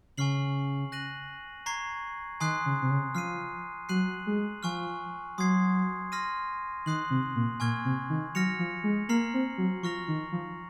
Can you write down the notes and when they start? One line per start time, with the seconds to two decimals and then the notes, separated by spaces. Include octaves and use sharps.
0.17 C#3 G#5 C#6 F6 C7 F#7
0.92 F#6 A#6 D#7 F#7
1.66 A#5 C#6 G#6 C7
2.40 D#3 G#5 C6 D#6 F#6 C7
2.65 C#3
2.82 C3
2.90 C#3
3.15 F3 F6 C7 D#7
3.89 F#3 F#6 C7 D#7 F#7
4.26 G#3
4.63 F3 G#5 C#6 F6
5.38 F#3 C6 D#6 G#6 C7
6.12 C6 F6 A#6 D#7
6.86 D#3 C6 D#6 F#6 C7 F#7
7.10 C3
7.35 A#2
7.60 A#2 G#5 C#6 F6 G#6
7.85 C3
8.10 D#3
8.35 F#3 F6 A#6 C#7 F7
8.59 F3
8.83 G#3
9.09 A#3 A#5 F6 C7 F#7
9.34 C4
9.58 F#3
9.83 F3 C#6 F6 A#6 F7
10.08 D#3
10.32 F3